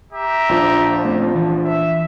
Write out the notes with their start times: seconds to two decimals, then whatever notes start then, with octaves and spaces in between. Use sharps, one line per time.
0.13 G4 E5 A#5
0.49 A#1 F3 D4
1.04 A3 C4 C#4
1.35 E3 A5
1.65 E5